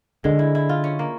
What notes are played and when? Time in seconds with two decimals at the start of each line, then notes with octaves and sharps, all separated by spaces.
0.24 D3 G#3
0.39 E4
0.55 E4
0.69 F4
0.84 C#4
0.99 A#3